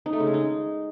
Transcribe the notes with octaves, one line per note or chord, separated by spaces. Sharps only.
D#4
A3
C#3
G#3
D#4